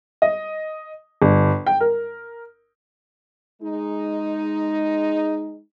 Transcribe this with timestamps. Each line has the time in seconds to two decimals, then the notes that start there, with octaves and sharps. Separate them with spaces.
0.22 D#5
1.22 G1
1.67 G5
1.80 A#4
3.62 G#3 D#4